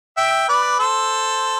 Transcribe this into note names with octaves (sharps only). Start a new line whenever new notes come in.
E5 G5
B4 D5
A4 C5